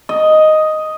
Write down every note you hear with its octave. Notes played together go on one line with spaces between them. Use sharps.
D#5